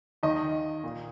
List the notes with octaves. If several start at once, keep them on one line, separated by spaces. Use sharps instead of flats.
D#2 D#3 D#5
A#2